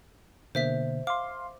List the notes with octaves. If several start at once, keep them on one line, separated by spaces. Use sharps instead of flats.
B2 D3 A#3 C5 E5 B6
F5 C6 D6